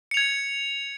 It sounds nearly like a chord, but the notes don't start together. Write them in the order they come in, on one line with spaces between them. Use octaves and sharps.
C#7 F7 G#6